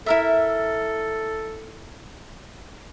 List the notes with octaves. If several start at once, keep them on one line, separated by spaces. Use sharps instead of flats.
E4 A4 A#4 E5